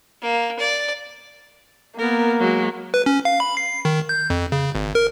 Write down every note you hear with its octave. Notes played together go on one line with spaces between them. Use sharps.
A#3
D5
A#3 B3 A#4
F#3 G#3
B4
C#4
F5
B5
C7
D#3
G6
F2
C#3
G#1
A#4